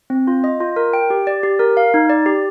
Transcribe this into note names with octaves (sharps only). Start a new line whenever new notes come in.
C4
F4
D#5
F4
A#4
G5
G4
D5
G4
A#4
F5
D#4
D5
G4